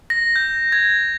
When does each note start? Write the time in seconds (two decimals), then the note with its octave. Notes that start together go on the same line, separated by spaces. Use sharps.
0.10 A#6
0.36 G6
0.72 G#6